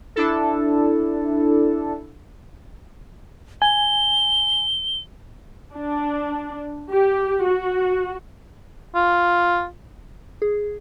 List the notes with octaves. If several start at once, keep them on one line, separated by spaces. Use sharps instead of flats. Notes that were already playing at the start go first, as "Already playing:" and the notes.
D4 E4 A4
G#5 G7
D4
G4
F#4
F4
G#4